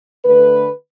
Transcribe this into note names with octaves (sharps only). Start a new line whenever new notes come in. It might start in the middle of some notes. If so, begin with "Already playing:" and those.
D3 A3 B4